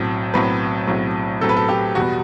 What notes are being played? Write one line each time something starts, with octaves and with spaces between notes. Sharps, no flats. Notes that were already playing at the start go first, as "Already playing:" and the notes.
Already playing: B1 A2 F#3 C4
B1 A2 F#3 C4 B4
B1 A2 F#3 C4
B1 A2 F#3 C4 A4
B4
A4
G4
E2 B2 G3 B3 F#4